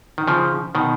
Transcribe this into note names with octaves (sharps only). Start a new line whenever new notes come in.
D#3
C#3 F3
B2 D#3